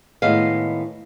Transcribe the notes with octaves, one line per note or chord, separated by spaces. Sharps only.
A2 D#3 G#3 B3 D#5 F5